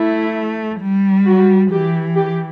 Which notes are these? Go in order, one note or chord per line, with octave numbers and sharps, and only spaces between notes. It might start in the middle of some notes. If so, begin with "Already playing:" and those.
Already playing: A3 E4
G3
F#4
E3 G4
G4